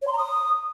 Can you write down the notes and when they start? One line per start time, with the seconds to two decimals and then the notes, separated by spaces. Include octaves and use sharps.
0.02 C#5
0.07 C6
0.13 A#5
0.18 D#6